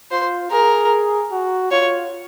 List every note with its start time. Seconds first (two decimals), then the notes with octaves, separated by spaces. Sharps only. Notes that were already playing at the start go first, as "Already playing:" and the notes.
0.11 F4 C5
0.51 G#4 A#4
1.32 F#4
1.71 F4 C#5